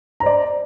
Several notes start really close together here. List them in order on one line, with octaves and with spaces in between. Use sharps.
A#5 C5 D5